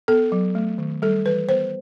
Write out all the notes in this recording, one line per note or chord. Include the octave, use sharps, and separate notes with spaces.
B3 A4
F#3
A3
D#3
G3 A4
E3 B4
B3 C5